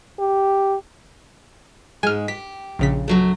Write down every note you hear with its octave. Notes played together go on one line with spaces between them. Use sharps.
G4
G#2 G#3 G#5 F6
G4 B6
A#1 C#3 B6
F#2 F#3 A3